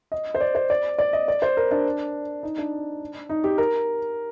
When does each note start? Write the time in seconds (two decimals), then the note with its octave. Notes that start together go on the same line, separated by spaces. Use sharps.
0.12 D#5
0.34 C5
0.40 D5
0.55 C5
0.70 D5
0.99 D5
1.13 D#5
1.28 D5
1.42 C5
1.57 A#4
1.71 D4
2.43 D#4
2.58 D4
3.29 D#4
3.44 G4
3.58 A#4